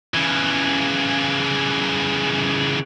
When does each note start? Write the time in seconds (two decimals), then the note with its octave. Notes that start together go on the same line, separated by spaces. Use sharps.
0.14 C#3 E3